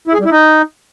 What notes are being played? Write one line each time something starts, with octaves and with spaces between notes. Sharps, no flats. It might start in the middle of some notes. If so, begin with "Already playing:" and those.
E4
G#4
G3
E4
D#4